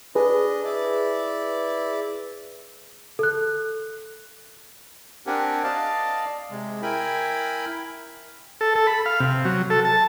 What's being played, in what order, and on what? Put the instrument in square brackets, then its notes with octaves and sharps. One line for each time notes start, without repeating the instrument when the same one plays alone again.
[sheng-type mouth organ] D4 D#5 [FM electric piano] G#4 B4
[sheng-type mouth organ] E4 D5
[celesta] A4 F#6
[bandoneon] C4 D4 G4 A#4 F#5 G#5
D5 D#5 F5 A5
C3 G#3
E4 A#4 G5 G#5 B5
[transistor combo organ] A4
A4
B5
F5
C3
F#3
A4
A5